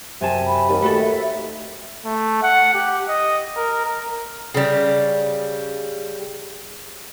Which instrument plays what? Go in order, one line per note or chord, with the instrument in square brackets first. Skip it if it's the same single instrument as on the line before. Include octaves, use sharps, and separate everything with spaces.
[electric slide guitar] F#2 G#5 A5 [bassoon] C3
[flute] B5
[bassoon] D#2
[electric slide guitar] A3 F#4 A4
[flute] E5
[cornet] A3
F#5
G4
D#5
A#4
A#4
[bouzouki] C#3 G3